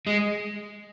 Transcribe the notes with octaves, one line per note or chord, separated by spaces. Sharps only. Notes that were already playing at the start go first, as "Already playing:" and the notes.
G#3